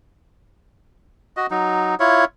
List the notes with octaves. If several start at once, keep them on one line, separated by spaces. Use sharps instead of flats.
F#4 D#5
F#3 D#4
E4 F4 C#5